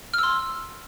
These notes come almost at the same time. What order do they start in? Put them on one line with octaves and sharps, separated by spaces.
F6 E6 C6